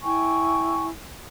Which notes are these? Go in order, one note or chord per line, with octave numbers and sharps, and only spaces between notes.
E4 G5 G#5 C#6